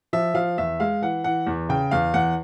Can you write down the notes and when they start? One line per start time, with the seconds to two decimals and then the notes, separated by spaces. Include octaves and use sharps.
0.13 F3 E5
0.34 F3 F5
0.58 E2 E5
0.80 G#3 F5
1.02 E3 F#5
1.24 E3 F#5
1.47 E2
1.69 C#3 G5
1.91 E2 F5
2.14 E2 F#5